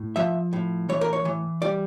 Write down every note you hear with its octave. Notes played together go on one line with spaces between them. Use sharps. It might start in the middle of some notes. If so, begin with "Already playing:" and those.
Already playing: A2
F3 E5
A2
E3 C#5
A#4
C#5
E3
G3 D5